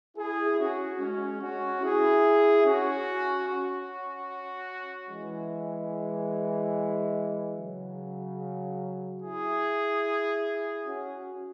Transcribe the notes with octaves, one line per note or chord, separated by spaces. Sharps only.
E4 G#4
C#4 F#4
G#3 C#4
C#4 F#4
E4 G#4
C#4 F#4
C#4 F#4
E3 G#3
C#3 F#3
E4 G#4
C#4 F#4